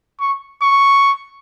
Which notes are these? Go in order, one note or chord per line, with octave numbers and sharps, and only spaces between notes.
C#6
C#6